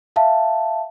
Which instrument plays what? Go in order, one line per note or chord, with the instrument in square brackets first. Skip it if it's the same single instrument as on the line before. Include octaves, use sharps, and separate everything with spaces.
[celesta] E5 F5 A5